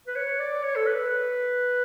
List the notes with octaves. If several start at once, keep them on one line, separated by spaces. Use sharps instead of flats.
B4
C#5
D5
C#5
A4
B4